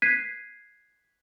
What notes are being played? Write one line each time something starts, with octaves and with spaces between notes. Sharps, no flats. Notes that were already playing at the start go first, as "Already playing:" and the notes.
F#6 G#6 B6 C7 D#7